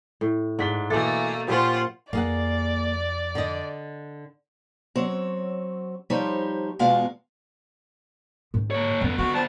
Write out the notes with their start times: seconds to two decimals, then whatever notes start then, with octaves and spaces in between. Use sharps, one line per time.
0.21 A2
0.59 G#2 D4 B6 G7
0.90 B2 E3 A3 A#3 A4 D6 A6
1.48 A#2 F3 C#4 F4 G4 C5 F#5
2.13 F2 A#3 G#4 D5 F#5
3.35 D3 D#5
4.95 F#3 C4 C#5
6.10 F3 G3 D#4 G4 C5 C#5
6.79 E2 B2 G#3 F4 F#4 F5
8.54 G#2 D#3
8.71 A#3 C#5
9.01 F2 D3 D#3 B3
9.18 C4 F#4
9.34 F3 G3 A5